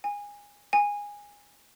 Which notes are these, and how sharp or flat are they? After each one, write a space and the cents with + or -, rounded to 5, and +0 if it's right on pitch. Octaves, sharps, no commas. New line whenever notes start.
G#5 -20
G#5 -15